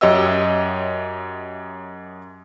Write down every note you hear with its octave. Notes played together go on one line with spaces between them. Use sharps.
F#2 G4 C#5 D#5 E5 E6